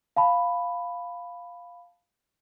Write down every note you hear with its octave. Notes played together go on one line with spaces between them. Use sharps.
F5 A5 B5